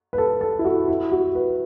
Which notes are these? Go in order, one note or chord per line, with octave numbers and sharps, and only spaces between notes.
B4
A4
A4
E4
F#4
E4
F#4
B4